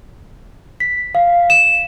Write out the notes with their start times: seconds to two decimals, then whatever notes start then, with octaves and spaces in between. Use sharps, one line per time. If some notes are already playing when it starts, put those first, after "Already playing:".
0.80 B6
1.15 F5
1.50 E7